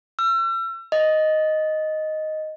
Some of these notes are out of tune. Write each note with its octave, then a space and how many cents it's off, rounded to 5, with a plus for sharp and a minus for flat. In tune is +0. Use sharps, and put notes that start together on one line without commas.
E6 +40
D#5 +0